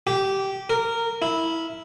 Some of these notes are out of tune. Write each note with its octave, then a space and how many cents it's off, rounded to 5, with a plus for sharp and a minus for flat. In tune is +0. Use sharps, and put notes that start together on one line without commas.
G4 -15
A#4 -15
E4 -10